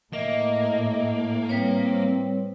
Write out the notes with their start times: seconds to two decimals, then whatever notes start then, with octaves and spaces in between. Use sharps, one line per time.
0.13 A2 A#3 D#5 E5
1.49 G3 C4 B4 C#5